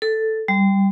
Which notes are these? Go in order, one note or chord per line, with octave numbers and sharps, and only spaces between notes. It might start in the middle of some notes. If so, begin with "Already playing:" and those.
A4
G3